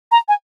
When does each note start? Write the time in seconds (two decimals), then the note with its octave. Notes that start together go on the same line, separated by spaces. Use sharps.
0.12 A#5
0.28 G#5